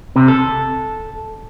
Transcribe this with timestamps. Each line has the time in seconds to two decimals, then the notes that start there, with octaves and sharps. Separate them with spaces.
0.16 C3
0.28 A4